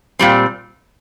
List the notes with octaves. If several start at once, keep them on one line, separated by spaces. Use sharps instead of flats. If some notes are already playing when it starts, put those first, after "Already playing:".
A#2 G3 C4